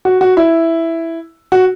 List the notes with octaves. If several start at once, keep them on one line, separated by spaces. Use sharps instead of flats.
F#4
F#4
E4
F#4